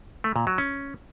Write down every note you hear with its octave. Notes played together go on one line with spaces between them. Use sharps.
A3
A#2
F#3
C#4